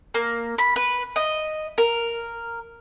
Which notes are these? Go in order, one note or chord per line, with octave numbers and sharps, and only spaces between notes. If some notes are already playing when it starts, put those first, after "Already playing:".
A#3
B5
B4
D#5
A#4